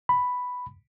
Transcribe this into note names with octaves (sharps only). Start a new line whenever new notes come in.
B5